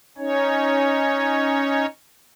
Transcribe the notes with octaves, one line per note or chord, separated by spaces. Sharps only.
C#4 D#4 C#5